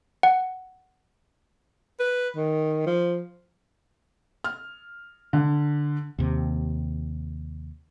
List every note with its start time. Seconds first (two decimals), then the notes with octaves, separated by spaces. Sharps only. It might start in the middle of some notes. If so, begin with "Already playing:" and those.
0.23 F#5
2.00 B4
2.36 D#3
2.86 F3
4.44 F6
5.33 D3
6.19 D#2 C3